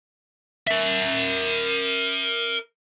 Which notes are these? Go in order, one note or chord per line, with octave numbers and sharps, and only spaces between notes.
A#4 E5